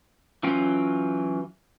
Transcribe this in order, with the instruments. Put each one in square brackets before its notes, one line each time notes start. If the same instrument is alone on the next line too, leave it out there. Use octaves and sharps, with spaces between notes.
[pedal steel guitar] E3 F#3 C#4 F4 G5